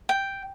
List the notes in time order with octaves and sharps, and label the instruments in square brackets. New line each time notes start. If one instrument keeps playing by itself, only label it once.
[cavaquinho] G5